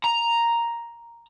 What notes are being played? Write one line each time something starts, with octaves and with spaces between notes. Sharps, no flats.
A#5